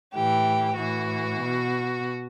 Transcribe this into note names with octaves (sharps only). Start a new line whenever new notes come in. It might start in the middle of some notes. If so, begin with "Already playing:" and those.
A2 E3 G4
A2 E3 F#4
B2